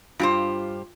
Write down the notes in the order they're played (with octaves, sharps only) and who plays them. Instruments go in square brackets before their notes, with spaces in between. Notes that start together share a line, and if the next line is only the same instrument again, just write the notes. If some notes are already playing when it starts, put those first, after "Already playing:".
[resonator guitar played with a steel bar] G2 G4 C5 [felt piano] F4